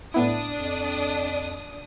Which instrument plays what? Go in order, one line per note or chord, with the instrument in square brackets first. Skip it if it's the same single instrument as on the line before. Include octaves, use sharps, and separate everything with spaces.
[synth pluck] A2 B3 E4 [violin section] D4 D#6
[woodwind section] F2